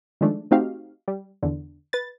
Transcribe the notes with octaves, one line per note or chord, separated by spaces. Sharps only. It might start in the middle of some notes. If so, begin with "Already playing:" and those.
D#3 F3 G#3 A3 D4
A3 C4 D#4 F#4 G4 F5
G3
E2 D3
B4 A6